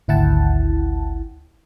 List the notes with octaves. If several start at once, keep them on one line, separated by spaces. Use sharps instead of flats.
G#1 D2 E4 F#5 G5 A5